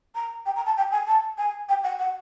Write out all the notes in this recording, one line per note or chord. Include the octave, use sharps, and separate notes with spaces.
A#5
G5
A#5
A5
G5
G#5
A5
G#5
G5
F#5
F#5